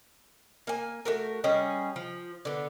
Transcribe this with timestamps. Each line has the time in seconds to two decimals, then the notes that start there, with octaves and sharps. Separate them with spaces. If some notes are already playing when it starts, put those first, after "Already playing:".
0.67 A#3 G#5
1.05 A3 F#4 A#4
1.44 G3 C#4 G#4 D#5
1.96 F3
2.45 D3 B3